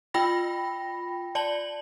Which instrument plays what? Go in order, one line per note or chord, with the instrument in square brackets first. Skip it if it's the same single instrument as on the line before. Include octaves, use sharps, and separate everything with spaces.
[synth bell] F4 G5 B5 A#6
D5 A5 F#7